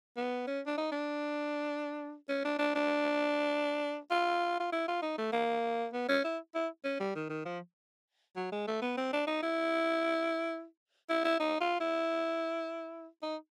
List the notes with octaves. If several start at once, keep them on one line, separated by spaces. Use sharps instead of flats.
B3
C#4
D4
D#4
D4
C#4
D4
D4
D4
F4
F4
E4
F4
D#4
A3
A#3
B3
C#4
E4
E4
C#4
G3
D#3
D#3
F3
F#3
G#3
A3
B3
C4
D4
D#4
E4
E4
E4
D#4
F4
E4
D#4